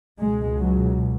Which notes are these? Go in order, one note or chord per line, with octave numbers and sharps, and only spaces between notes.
C#2 B2 G#3
F#3